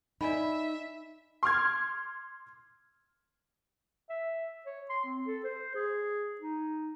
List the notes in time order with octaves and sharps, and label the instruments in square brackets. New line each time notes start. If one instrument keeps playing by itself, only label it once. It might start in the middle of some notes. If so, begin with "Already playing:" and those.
[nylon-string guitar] D#4 [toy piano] D5 G#5 B5 [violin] E5
[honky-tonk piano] C6 D6 F6 G#6
[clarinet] E5
C#5
C6
C4
A4
C5
G#4
D#4